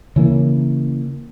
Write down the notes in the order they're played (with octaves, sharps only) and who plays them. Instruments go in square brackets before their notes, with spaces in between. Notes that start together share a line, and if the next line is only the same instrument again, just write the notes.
[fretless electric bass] C#3 E3 A#3